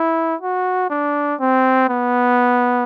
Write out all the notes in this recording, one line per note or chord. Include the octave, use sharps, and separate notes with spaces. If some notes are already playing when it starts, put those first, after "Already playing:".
Already playing: E4
F#4
D4
C4
B3